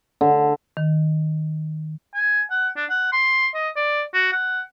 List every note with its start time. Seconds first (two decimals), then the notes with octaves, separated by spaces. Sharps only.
0.21 D3
0.77 D#3
2.14 G#5
2.51 F#5
2.76 D4
2.90 F#5
3.12 C6
3.54 D#5
3.76 D5
4.14 F#4
4.32 F#5